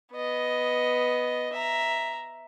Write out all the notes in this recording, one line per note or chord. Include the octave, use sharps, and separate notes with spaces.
B3 D#5
E5 A#5